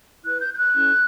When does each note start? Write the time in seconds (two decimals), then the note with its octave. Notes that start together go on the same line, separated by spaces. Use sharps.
0.24 E4 B4 F#6
0.40 G6
0.53 G6
0.57 F#6
0.74 C#4 E4 A4